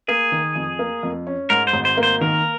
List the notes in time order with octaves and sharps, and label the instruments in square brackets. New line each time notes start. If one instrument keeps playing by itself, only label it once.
[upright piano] A#3 [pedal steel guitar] G#4
[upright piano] D#3
F2
A#3
F2
C#4
[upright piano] G#2 [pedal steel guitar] A#4
[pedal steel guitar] C5
[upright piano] G#1
[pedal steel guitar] C5
[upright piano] A#3
[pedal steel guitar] C5
[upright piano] D#3 [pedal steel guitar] A#4